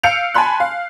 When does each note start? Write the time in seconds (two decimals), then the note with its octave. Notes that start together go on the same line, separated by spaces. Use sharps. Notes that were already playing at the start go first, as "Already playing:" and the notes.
0.03 F5 E6 G6 C#7 D7 F7
0.34 G#5 A5 B5 C6 F#6
0.60 F5